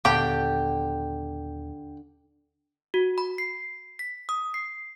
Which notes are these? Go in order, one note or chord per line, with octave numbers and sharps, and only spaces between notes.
D#2 A#2 D3 B3 G4 G5
F#4
B5
C7
B6
D#6
C7